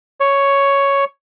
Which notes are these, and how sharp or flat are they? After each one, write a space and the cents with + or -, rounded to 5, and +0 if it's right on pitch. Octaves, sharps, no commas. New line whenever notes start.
C#5 +5